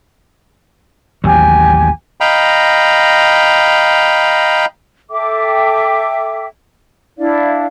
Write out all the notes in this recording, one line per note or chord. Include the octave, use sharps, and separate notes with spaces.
A1 D#2 F#3 G4 G#5
D#5 F5 G5 A#5 B5
A4 E5 G5 D6
D4 E4 D5 F5